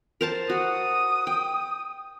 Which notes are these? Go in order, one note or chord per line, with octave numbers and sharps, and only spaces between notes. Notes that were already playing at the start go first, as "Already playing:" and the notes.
A#4 C5 A5
F#4 D#6
G5